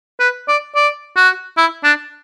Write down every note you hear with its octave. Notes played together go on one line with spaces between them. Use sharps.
B4
D5
D5
F#4
E4
D4